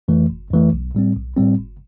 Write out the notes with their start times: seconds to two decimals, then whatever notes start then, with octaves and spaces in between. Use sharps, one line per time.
0.08 F2 E3 A3
0.30 G1
0.51 F2 E3 A3
0.73 B1
0.95 A2 G3 C4
1.16 B1
1.36 A2 G3 C4
1.58 G1